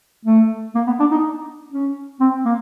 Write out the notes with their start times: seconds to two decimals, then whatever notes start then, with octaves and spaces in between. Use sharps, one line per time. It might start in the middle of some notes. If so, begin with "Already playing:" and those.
0.25 A3
0.75 A#3
0.87 B3
1.00 D4
1.11 D#4
1.72 C#4
2.20 C4
2.45 A#3